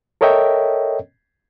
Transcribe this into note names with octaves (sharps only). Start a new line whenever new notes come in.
A4 A#4 C#5 D#5 E5 G5